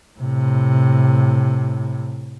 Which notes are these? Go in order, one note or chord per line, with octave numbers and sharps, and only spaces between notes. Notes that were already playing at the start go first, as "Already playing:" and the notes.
A2 C3